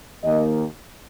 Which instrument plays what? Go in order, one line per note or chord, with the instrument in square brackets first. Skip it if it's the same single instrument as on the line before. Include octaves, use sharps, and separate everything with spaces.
[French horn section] D#2 D#3 A#3 D#5